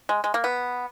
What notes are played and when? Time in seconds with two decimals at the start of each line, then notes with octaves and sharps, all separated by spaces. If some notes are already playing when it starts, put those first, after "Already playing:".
0.09 G#3
0.24 G#3
0.34 A#3
0.44 B3